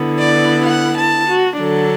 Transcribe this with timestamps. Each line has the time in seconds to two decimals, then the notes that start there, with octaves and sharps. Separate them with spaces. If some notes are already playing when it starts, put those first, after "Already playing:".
Already playing: D3 B3 E4
0.17 D5
0.65 F#5
0.96 A5
1.27 F#4
1.57 D3 F#3 D4 A4